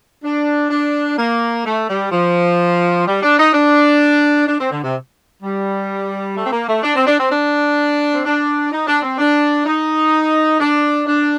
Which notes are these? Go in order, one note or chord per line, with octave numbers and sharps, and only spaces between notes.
D4
D4
A#3
A3
G3
F3
G3
D4
D#4
D4
D4
C4
D3
C3
G3
A3
C4
A#3
A3
D4
C4
D4
C4
D4
C4
D4
D#4
D4
C4
D4
D#4
D4
D4